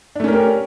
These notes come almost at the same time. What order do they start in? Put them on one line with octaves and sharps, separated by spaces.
D4 A3 C#4 A#4 G4